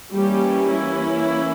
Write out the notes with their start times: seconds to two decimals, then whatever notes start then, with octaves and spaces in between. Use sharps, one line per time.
0.14 E3 G3 A#3 C#4 G4
0.69 E4